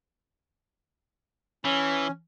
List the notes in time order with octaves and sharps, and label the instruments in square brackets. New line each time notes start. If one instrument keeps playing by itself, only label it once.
[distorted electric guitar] E3 [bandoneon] C#4